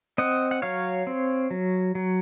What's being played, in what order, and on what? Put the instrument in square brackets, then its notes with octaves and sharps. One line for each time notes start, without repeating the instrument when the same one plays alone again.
[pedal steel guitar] C4 D#5 F#5
F#5
F#3 C#5 F5
C4
F#3
F#3